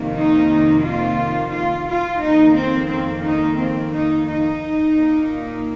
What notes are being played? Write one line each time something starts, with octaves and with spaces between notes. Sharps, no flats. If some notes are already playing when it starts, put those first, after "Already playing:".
Already playing: F2 C3 D#3 A#3
D#4
F4
F4
F4
F2 D#3 A#3 D#4
C4
C4
D#4
C4
D#4
D#4
A#2 A#3